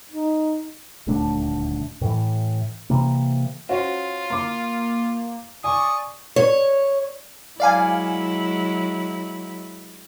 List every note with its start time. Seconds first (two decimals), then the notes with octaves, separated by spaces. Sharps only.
0.13 D#4
1.07 D#1 D2 A3 D4
2.01 A2 E3
2.90 C3 E3 A#3
3.69 C#4 F4 F#4 C5
4.30 A#3 C6 D6
5.64 D5 G#5 C#6 D#6
6.36 C#5
7.60 F#3 G#3 E4 D5 F5 G#5